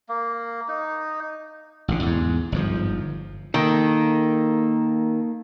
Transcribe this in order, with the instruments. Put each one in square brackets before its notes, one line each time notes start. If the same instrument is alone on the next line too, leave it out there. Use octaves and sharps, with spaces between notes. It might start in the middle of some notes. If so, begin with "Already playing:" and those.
[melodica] A#3
D#4
[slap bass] A1 D3
E2 G#2
G1 G#2 F3
[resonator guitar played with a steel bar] D#3 [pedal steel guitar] A#3 A4